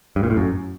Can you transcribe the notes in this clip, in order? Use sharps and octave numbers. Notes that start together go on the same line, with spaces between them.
G2
A#2
A2
F#2